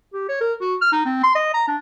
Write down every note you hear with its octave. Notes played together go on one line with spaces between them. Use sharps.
G4
C#5
A#4
F#4
F6
D#4
C4
C6
D#5
A#5
D4